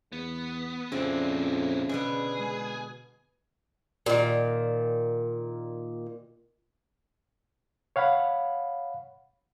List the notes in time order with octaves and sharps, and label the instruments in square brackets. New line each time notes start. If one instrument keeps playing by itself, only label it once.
[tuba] E2 [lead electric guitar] B3
[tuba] F2 [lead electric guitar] A#2 E4 [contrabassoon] C#3 [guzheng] C4 D4
[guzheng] B2 D3 B3 [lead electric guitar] G#4
[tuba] G#3
[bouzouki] A#2 D#3
[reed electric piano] C#5 F5 F#5 B5